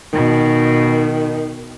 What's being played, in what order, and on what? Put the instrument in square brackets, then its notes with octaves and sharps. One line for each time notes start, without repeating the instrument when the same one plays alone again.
[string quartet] B2 [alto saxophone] D#3